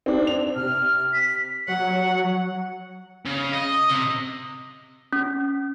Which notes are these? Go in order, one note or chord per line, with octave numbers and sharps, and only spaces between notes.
C4 D4
F7
C3 F6
B6
F#3 F#5
C#3
D#5
C3
C#4